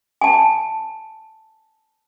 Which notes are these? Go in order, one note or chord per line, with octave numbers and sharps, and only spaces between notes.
G#5 A5